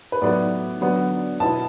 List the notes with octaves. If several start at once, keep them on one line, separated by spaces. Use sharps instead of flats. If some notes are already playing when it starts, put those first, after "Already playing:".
B4
A2 F#3 B3 D5
D3 F#3 B3 D4
B2 B3 E4 A5